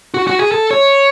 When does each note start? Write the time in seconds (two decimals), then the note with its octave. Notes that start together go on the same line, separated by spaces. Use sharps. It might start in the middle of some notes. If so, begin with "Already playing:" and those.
0.14 F#4
0.27 F#4
0.39 G#4
0.52 A4
0.71 C#5